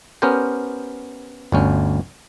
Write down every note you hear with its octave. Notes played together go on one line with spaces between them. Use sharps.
B3 C#4 G4 A#4 C5 G5
G1 D2 C#4